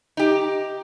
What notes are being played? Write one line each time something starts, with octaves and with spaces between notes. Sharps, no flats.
D#4 G4